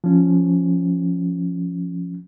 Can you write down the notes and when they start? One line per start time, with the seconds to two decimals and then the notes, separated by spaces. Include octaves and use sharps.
0.04 F3 C#4